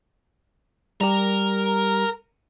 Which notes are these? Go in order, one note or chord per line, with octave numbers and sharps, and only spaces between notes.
G3 G4 A#4